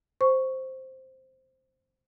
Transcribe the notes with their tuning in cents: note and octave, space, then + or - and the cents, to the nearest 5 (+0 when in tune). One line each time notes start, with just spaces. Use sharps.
C5 +0 C#6 +0